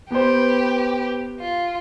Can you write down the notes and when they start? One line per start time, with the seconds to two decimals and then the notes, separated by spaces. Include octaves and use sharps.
0.11 B3 G4 B4 C5
1.40 F4